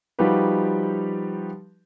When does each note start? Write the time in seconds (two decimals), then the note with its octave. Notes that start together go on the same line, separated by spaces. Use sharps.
0.19 F3 G3 D#4 F#4 G4 B4